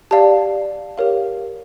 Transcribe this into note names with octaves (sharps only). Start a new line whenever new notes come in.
G4 D5 F5 A5
G4 A#4 C#5 F5